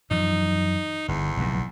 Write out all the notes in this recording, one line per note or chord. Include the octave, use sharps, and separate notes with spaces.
F#2 E3 F3 D#4
G1 E2
F1 B1 A#2